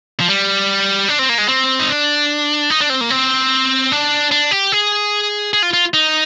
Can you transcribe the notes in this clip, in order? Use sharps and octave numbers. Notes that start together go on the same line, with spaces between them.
F3
G3
D4
C4
A#3
G#3
C4
D#4
D4
D#4
D4
C4
A#3
C4
D4
D4
G4
G#4
G#4
F4
F4
D#4